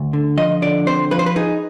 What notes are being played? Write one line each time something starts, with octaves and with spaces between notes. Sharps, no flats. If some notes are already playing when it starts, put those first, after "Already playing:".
Already playing: D2
D3
F3 D#5
D3 D5
C4 C5
F3 B4
C5
B4
D#4 G#4